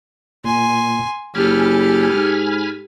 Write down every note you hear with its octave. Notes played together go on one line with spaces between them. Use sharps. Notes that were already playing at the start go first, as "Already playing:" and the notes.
A#2 G#5 C6
F#1 G4 A4 G#5 B5 F6
G#2